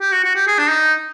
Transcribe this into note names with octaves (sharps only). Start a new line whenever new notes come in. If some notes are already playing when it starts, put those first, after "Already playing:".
G4
F#4
F#4
G4
G#4
D4
D#4